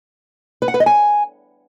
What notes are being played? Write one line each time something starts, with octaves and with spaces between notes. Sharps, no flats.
B4
F#5
B4
D#5
G#5